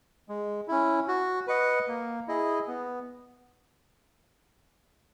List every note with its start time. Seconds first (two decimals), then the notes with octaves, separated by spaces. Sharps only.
0.29 G#3
0.68 C#4 E4
1.08 F#4
1.47 B4 D#5 F#5
1.88 A#3
2.28 E4 G#4 D#5
2.67 B3